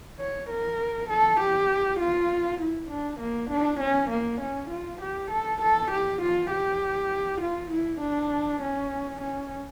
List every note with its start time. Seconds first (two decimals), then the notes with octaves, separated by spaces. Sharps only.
0.20 C#5
0.50 A#4
1.10 A4
1.40 G4
2.00 F4
2.61 E4
2.91 D4
3.20 A#3
3.50 D4
3.80 C#4
4.10 A#3
4.41 C#4
4.70 F4
5.02 G4
5.31 A4
5.62 A4
5.91 G4
6.22 F4
6.51 G4
7.41 F4
7.71 E4
8.01 D4
8.62 C#4
9.21 C#4